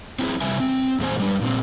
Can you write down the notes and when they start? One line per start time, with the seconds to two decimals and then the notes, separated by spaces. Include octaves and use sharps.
0.19 C4 E4 F4 G#4
0.41 C3 G3 E5 G#5
0.60 C4
1.00 E2 A#2 G#3 D4 C5 G#5
1.20 G3 D4
1.41 A#2 C4